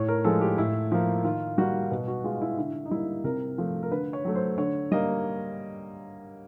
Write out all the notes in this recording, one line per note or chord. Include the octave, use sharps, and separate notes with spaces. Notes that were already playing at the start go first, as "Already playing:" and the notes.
Already playing: A2 C#5
A#4
F3 G#3 A4
G4
A2 E4
F3 A#3
D#3 F4
G3 A#3 F#4
B2
F#4
G#3 F4
E4
D3 E4
D#4
G3 A#3 E4
C3 A#4
F3 A3
A#4
D3 B4
C#5
F#3 A3
C5
D3 C#5
G3 A#3 D#5